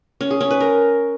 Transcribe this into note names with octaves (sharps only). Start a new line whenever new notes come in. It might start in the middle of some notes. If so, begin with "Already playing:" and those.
C#4
G#4
C#4
B4
A#4